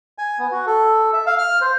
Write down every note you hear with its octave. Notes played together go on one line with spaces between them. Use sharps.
G#5
B3
F#4
A4
E5
F5
F6
C5